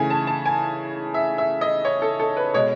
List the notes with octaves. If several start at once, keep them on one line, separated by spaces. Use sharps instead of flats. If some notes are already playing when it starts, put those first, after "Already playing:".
Already playing: C#3 E3 A3 G#5
A5
A5
G#5
E5
E5
D#5
C#5
A4
A4
B4
B2 G#3 C#5